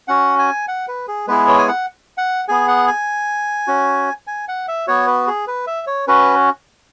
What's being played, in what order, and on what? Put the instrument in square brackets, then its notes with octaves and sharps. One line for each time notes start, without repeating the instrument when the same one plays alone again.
[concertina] C#4 F#4 F#5
G#5
F#5
B4
G#4
G#3 B3 E4 G#4 B4
C#5
G#5
F#5
F#5
B3 G#4 G#5
F#5
G#5
C#4 F#4
G#5
F#5
E5
B3 F#4 C#5
B4
G#4
B4
E5
C#5
C#4 F#4 B4